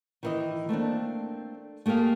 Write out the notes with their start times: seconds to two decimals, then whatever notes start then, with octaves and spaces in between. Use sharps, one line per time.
0.23 D#3 E3 D#5
0.69 A3 A#3 C4 D4
1.86 A3 A#3 G4 G#4 F5